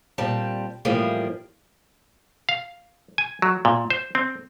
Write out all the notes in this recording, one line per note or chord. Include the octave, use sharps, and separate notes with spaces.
A#2 G3 C4 A5
A2 E3 F3 G3 A#3 G#4
F5
G#5
F#3
A#2
C5
C4